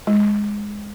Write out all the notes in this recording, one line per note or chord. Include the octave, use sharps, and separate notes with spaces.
G#3